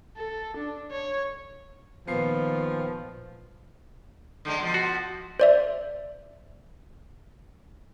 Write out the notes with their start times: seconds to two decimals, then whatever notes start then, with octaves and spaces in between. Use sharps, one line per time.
0.16 A4
0.57 D4
0.92 C#5
2.07 A#2 D#3 F3 B3 F4 C7
4.45 D3 G#3 C4
4.60 B2 F3
4.74 F#4
5.40 C5 D5 E5